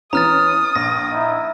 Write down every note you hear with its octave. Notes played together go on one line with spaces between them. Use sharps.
E3 B3 C#4 A#5 D#6 F6 A6
A#1 A#6
D#4 E4 E5